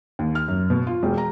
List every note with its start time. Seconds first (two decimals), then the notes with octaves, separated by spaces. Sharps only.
0.19 D#2
0.35 F6
0.48 F#2
0.70 B2
0.87 F4
1.03 E1
1.18 A#5